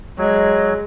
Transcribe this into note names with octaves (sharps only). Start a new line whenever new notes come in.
F#3 G#3